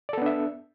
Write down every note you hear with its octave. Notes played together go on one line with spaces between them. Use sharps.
B3 D4 A4 D5 E5